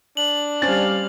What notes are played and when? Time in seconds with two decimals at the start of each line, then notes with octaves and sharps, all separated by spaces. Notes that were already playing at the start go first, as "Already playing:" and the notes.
0.17 D4 F#7
0.62 G3 C4 C#4 D5 F5 A6